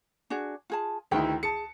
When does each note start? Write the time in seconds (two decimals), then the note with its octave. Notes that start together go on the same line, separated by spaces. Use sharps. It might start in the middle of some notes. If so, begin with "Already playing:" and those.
0.30 D4 F#4 G#4
0.70 F4 G#4 A5
1.11 D2 D#3 E4 G#4 B4 G5
1.43 G#4 A5 C#7